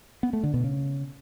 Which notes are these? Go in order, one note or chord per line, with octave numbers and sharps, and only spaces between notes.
B3
A3
D3
B2
C#3